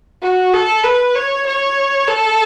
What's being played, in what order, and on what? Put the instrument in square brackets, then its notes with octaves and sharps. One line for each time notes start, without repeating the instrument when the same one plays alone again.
[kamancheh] F#4
A4
B4
C#5
C#5
A4